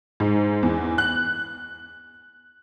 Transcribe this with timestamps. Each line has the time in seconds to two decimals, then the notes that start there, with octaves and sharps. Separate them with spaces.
0.20 G#2
0.63 E2
0.98 F#6